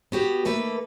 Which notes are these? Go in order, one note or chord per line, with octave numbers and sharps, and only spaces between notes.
B3 F#4 G4
D#3 A3 A#3 A4 B4